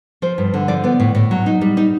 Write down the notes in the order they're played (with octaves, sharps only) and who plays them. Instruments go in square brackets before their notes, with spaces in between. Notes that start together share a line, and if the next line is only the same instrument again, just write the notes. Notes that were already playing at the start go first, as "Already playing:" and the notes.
[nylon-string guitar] F3 C5
G2
D3
F3 D5
B3 D5
A2
A2
F#3
D#4
G3
D#4